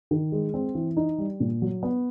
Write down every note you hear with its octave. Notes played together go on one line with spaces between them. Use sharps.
D#3
G#3
C4
E3
D#4
G3
A#2
F#3
B3